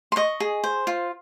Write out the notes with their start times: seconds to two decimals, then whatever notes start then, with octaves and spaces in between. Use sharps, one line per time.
0.12 C6
0.16 D#5 C#6
0.40 G#4
0.64 C5
0.87 F4